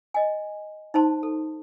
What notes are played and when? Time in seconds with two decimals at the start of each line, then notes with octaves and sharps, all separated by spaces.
0.14 D#5 G#5
0.94 D#4 C5 A5 C6
1.23 A4